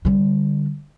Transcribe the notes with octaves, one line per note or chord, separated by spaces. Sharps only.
D3 G3